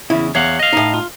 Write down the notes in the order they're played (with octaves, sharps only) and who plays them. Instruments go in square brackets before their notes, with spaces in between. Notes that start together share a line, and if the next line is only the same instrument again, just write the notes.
[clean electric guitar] E2 C#3 [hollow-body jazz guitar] E4
[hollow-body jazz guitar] E2 [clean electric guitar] C#5 F5 F#5
[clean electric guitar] D#5 F5
[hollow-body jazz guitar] A2 D#4
[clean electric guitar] F4